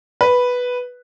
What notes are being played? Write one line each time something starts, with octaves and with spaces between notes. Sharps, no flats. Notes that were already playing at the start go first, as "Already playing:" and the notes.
B4